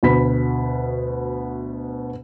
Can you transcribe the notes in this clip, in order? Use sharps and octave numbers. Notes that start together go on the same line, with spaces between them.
D2 B2 B5 B6